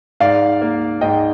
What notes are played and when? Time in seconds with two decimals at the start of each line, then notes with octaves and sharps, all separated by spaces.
0.20 G#2 D5 F5
0.62 A#3
1.01 G#2 D#5 G5